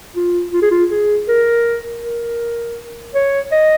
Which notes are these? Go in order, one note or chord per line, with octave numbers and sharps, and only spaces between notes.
F4
F4
G#4
F4
G#4
A#4
A#4
C#5
D#5